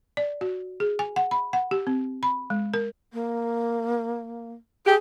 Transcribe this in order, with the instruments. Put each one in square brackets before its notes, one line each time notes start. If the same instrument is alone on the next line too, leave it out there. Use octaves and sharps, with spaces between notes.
[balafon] D5
F#4
G#4
G#5
F#5
B5
F#5
G4
C4
B5
G#3
A#4
[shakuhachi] A#3
[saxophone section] G4 [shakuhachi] G#4